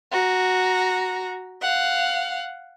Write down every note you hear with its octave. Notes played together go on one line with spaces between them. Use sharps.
F#4 A#5
F5 F#5